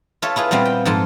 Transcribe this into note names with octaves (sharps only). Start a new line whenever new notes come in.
F4 A4 C#5 E5
E4 F4 G#4 B4
A#2 G3 B3 C4 F4
G5
G#2 F3 A4 C6